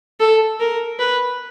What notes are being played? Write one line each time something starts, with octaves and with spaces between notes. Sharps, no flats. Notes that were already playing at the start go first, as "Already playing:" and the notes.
A4
A#4
B4